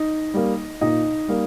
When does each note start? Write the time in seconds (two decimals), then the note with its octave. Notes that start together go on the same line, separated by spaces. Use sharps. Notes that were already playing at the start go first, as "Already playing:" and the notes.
Already playing: D#4
0.34 G3 A#3
0.81 A#2 D#4
1.28 G3 A#3